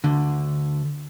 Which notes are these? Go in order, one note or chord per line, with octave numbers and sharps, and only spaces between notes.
D2 D3